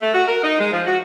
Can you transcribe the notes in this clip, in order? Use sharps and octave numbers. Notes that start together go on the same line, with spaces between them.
A3
F#4
A#4
D#4
G#3
F3
F#4